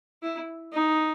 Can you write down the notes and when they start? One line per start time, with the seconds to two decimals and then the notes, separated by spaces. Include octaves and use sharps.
0.22 E4
0.72 D#4